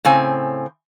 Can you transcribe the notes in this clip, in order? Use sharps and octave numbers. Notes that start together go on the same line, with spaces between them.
A2 C#3 C4 G#5